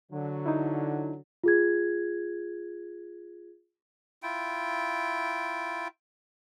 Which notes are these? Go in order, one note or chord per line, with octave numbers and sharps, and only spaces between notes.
D3 F#3
D#4 E4
F4 G#4 G#6
E4 F4 G5